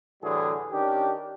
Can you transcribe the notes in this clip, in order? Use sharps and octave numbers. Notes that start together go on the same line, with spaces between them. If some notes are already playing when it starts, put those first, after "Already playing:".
A2 D3 E3 G3 F#4 G#4
D#3 C#4 D4 G4